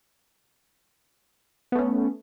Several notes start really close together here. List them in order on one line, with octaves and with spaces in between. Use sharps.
B3 A3 C#4